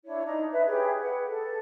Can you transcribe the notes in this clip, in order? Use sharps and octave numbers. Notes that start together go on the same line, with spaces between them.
D4 E4 C#5
D4 D#4 A#5
B4 E5
G4 G#4 B4 C#5
B4 F#5
A4